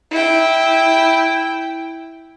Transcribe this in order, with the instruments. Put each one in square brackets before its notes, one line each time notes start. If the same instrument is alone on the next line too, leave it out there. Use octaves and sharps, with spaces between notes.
[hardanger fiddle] E4 G5